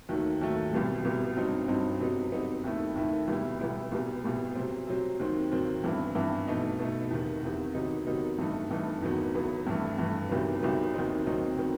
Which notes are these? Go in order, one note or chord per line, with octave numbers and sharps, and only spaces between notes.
D#2 D#3 F#3 A3
D#2 D#3 F#3 A3
C2 B2 G3
C2 B2 G3
G2 F#3 C4 D#4
G2 F#3 C4 D#4
C3 F#3 B3 D#4
C3 F#3 B3 D#4
D#2 D#3 A3 E4
D#2 D#3 A3 E4
C2 B2 G3 B3 E4
C2 B2 G3 B3 E4
C2 B2 G3
C2 B2 G3
C3 F#3 C4
C3 F#3 C4
D#2 D#3 F#3 C4
D#2 D#3 F#3 C4
G2 E3 B3 E4
G2 E3 B3 E4
B2 A3 D#4
B2 A3 D#4
E2 C3 D#3
E2 C3 D#3
C3 D#3 F#3 B3 D#4
C3 D#3 F#3 B3 D#4
G2 E3 A3 D#4
G2 E3 A3 D#4
E2 D#3 F#3 B3
E2 D#3 F#3 B3
G2 E3 A3
G2 E3 A3
C2 C3 D#3 F#3 B3
C2 C3 D#3 F#3 B3
D#2 D#3 F#3 C4 D#4
D#2 D#3 F#3 C4 D#4
D#3 F#3 B3